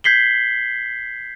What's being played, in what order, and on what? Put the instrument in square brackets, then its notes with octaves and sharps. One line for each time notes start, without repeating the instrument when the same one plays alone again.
[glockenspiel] G6 G#6 B6 C7 F#7 G7